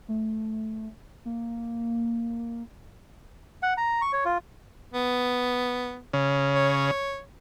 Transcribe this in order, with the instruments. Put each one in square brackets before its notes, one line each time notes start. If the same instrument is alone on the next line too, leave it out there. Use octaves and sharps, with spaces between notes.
[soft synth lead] A3
A#3
[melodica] F#5
A#5
C#6
C#5
F4
[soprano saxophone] B3
[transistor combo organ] C#3
[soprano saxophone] C#5